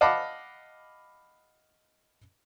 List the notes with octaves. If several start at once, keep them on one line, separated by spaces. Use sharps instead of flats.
D#5 F5 F#5 A5 B5 D6